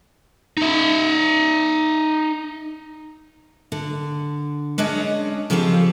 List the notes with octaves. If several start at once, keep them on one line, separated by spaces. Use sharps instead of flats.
D#4 E5
D3
G#3 C#4 D4 C#5 D#5
C#3 F3 C4 F4 G4 A4